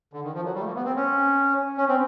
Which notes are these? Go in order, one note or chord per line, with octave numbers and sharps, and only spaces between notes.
D3
D#3
F3
F#3
G3
A3
A#3
B3
C4
C#4
C#4
C4